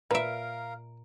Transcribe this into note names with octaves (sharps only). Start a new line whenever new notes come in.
A#2 A#4 B4 E5 F5 A#5 D7